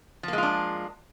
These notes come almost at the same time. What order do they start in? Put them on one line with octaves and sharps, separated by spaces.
F3 A#3 G#3 F4 D4